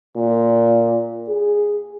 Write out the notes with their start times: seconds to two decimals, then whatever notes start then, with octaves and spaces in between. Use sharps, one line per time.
0.16 A#2
1.28 G#4